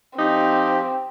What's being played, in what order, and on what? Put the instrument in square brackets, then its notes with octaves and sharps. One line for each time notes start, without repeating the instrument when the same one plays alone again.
[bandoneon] F3 G4 [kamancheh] C4 [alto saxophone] D#4